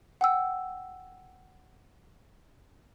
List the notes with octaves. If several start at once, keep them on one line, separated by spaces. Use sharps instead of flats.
F#5 G5 E6